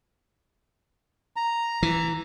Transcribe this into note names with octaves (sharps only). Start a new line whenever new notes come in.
A#5
E3